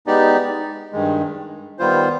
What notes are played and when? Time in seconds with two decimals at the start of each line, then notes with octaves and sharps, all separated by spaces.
0.06 G#3 B3 D#4 G4 D5
0.93 G2 D#3 G#3
1.79 D#3 G3 B3 F4 C5